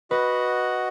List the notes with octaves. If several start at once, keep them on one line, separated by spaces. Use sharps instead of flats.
F#4 B4 D#5 F#5